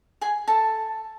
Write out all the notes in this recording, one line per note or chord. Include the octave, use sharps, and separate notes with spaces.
G#4 G#5
A4 A5